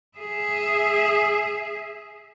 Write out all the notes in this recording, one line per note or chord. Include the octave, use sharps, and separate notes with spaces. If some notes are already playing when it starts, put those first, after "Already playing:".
G#4 E5